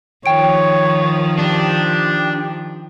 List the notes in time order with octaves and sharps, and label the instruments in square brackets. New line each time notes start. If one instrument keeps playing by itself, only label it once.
[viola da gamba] D#3 F3 [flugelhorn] C#5 [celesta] G5 D7
[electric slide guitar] D4 [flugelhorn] G4